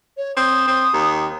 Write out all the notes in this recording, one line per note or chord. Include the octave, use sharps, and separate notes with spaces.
C#5
C4 D#6
C4
D#2